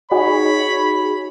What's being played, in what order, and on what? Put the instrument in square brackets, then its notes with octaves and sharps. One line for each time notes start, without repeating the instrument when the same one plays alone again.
[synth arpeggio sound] D#4 F#4 G#4 [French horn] C#5 [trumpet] B5